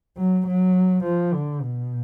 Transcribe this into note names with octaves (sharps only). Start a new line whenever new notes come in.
F#3
F#3
F3
D3
B2